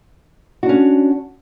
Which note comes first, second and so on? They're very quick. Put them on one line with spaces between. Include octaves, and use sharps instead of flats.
F#4 D4 C#4